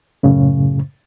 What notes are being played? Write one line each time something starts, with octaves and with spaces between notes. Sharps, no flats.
F#2 A2 C#3